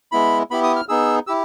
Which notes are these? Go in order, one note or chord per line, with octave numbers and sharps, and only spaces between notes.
G#3 B3 E4 B5
B3 E4 G4 B5
D#6
F6
B3 D#4 G#4 E6
E4 G4 E6